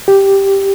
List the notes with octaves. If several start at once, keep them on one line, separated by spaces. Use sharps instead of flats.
G4